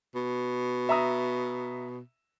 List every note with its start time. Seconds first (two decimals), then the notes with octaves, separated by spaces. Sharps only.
0.15 B2
0.89 E5 A#5 D#6